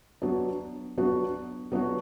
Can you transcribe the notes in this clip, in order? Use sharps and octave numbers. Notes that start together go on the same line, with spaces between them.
F#3 B3 D4 F#4
F#3 B3 D4 F#4
F#3 B3 D4 F#4